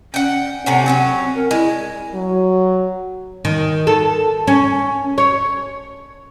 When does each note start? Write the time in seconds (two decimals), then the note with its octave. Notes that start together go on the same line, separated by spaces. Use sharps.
0.14 C#4 F#5 G5
0.66 A2 C3 C#4 F#5
0.86 F#3 A#3 C4 C#4
1.35 A#4
1.51 G#3 E4
2.14 F#3
3.45 D#3
3.87 A4
4.47 C#4
5.18 C#5